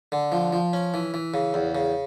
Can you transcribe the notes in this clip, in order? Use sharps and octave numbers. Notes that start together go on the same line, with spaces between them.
D3
F3
F3
C#4
E3
E3
C#3
E2
C#3